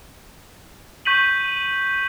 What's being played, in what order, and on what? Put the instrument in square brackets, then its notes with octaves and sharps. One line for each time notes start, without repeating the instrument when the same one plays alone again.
[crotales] C#6 G6 B6 D#7 F#7